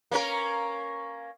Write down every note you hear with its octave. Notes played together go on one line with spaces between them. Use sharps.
A#3 C#4 A#4